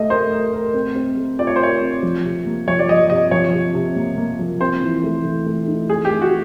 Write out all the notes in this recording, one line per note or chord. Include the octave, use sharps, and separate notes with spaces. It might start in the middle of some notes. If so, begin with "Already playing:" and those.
Already playing: A3 D#5
A#4 C5
A#4
A#4
C4
C4
A3
F4 D5
C#5
C5
A#4 C#5
C4
F3
C3
A#3
F3 C#5
D5
F3 D#5
C3 D#5
F3 C#5
C3
C3
A#3
A#3
F3
C4 C5
E3
A3
E3
A3
D#4
A3 G#4
G4
A3
F#4